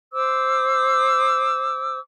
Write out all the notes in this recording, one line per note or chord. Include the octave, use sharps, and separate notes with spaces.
C5 D6 E6